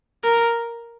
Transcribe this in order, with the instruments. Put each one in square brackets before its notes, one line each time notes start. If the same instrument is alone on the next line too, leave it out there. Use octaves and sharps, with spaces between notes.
[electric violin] A#4